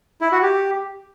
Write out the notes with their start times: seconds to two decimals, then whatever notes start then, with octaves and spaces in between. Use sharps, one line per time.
0.21 E4
0.32 F#4
0.42 G4